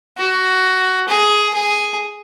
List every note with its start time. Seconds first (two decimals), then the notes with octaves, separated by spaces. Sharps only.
0.17 F#4
1.08 G#4
1.54 G#4